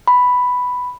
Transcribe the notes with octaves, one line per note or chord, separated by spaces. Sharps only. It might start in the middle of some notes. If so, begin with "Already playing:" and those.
B5